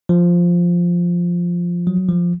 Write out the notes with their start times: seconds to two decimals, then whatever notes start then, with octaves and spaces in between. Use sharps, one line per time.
0.09 F3
1.87 F#3
2.09 F3